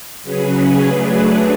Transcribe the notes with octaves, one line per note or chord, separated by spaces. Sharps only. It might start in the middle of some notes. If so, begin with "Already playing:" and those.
C#3 F#3 C#4 G#4 B4
F#3 A3 D4 G#4 B4